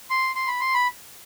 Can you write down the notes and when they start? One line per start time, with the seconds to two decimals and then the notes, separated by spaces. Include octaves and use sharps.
0.10 C6
0.36 C6
0.47 B5
0.60 C6
0.74 B5